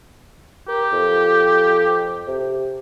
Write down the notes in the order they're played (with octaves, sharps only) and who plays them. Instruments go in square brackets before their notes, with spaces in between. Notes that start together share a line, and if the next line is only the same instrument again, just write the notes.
[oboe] G4 [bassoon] A#4
[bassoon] F2
C3